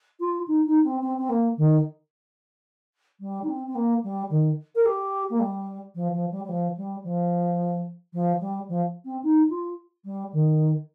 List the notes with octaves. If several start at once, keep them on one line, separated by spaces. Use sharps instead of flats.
F4
D#4
D#4
C4
C4
C4
A#3
D#3
G3
D#4
C4
C4
A#3
G3
D#3
A#4
G4
A#3
G3
F3
F3
G3
G3
F3
G3
F3
F3
G3
F3
C4
D#4
F4
G3
D#3